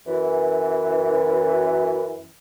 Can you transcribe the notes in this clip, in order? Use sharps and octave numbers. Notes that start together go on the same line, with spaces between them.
F#2 E3